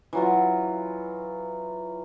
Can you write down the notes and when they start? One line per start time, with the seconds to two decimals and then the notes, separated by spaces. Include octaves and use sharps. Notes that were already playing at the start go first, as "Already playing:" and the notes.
0.13 E3 F#3 F4